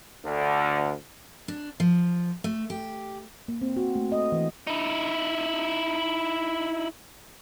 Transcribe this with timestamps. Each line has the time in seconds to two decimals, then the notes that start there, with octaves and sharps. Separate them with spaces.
0.25 D2 D3
1.48 D4
1.80 F3
2.44 A3
2.70 G4
3.48 A#3
3.62 C4
3.76 F#4
3.96 A3
4.12 D#5
4.32 E3
4.67 D#4 E4